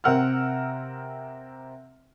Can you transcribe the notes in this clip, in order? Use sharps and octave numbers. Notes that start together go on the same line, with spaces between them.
C3 C4 A#4 F#5 E6 F6